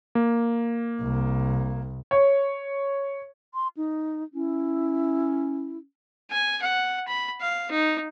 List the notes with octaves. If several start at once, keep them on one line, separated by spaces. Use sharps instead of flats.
A#3
C2
C#5
C6
D#4
C#4 E4
G#5
F#5
B5
F5
D#4